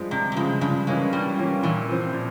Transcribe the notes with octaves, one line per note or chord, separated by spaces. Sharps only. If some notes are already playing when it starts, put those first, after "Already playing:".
Already playing: G2 F3 G#3
G2 C3
C3
C#3 F3 G#3
G2 C#3
E3 G#3 A#3 C#4 F4
G2 G3
E3 A#3 C#4 F4
A#2 E3
F3 C4
A#2